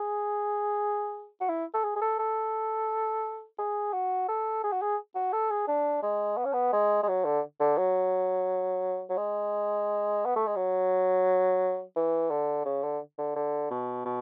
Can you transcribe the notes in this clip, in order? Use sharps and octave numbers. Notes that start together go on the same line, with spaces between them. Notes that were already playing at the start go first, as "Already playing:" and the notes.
Already playing: G#4
F#4
E4
A4
G#4
G#4
A4
A4
G#4
F#4
A4
G#4
F#4
G#4
F#4
A4
G#4
D4
G#3
B3
C#4
B3
G#3
G#3
F#3
D3
D3
F#3
F#3
G#3
B3
A3
G#3
F#3
E3
D3
C#3
D3
D3
D3
B2
B2